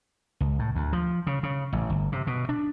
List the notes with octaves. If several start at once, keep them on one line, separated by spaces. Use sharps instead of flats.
C#2
A2
D2
F3
C#3
C#3
A1
G1
C3
B2
D4